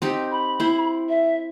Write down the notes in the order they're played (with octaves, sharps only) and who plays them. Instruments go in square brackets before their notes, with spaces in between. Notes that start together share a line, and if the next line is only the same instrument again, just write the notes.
[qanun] C4 D#4 G4
[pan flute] B5
[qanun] E4 C5
[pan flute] E5